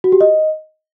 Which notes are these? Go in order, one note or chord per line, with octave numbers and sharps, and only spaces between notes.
F#4
G4
D#5